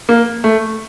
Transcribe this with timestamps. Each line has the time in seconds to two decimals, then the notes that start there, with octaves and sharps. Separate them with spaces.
0.09 A#3
0.44 A3